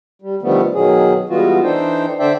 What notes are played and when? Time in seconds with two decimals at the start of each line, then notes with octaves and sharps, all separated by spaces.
0.22 G3
0.42 D3 D#3 F3 G3 A3 B3
0.74 B2 D#3 F#3 G#4
1.29 E3 G3 G#3 B3 F4 F#4
1.63 E3 D4 D#4 A4 C5 G5
2.19 D3 D4 C5 D5 E5 G5